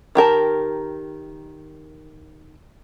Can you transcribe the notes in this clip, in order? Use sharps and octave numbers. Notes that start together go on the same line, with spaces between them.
D#3 G4 A#4 A5